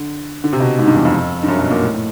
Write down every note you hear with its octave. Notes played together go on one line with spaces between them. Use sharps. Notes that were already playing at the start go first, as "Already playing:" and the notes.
Already playing: D3
D3
C3
B2
G#2
G2
E2
F2
G2
F#2
B2
A#2
A2
A2